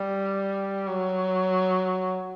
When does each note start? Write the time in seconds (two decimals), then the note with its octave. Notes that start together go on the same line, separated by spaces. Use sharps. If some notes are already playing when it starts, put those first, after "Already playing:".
Already playing: G3
0.87 F#3